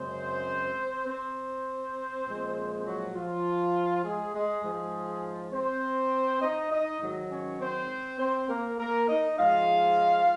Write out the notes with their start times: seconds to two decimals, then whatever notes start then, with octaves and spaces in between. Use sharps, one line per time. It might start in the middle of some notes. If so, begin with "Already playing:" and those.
Already playing: F#2 C#3 G#3 C4 C5
1.07 C4 C5
2.26 A#2 F3 G#3
2.85 F#3 F#4
3.15 F3 F4
4.03 G#3 G#4
4.33 G#3 G#4
4.63 G#2 F3 G#3
5.52 C4 C5
6.41 D#4 D#5
6.71 D#4 D#5
7.00 G#2 D#3 F#3
7.30 C#4 C#5
7.60 C4 C5
8.19 C4 C5
8.49 A#3 A#4
8.79 A#3 A#4
9.09 D#4 D#5
9.38 G#2 F3 G#3 F4 F5